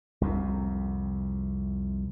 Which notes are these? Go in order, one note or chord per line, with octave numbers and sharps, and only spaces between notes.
C2 F2 C3